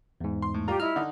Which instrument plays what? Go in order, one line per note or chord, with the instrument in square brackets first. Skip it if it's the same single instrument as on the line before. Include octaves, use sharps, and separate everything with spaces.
[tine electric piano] E2 G#2
[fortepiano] C6
A2
[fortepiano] G3 F4 A#5 [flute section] G4
[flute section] E4 [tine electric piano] D#5 F6
[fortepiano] D3 D#4